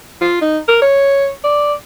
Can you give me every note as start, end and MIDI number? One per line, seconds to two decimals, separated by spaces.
0.21 0.39 65
0.41 0.58 63
0.68 0.78 70
0.82 1.30 73
1.44 1.73 74